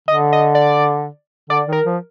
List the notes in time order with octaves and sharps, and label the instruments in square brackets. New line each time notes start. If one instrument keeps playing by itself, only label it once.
[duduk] D3 [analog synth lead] D#5
[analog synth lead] D#5
D5
[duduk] D3 [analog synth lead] D5
[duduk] D#3
[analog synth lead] A#4
[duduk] F3